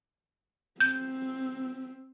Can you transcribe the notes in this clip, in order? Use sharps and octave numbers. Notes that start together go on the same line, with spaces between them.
C4 G6